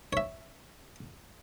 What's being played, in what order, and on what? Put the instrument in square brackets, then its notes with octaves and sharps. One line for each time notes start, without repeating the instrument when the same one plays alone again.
[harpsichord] C#5 E5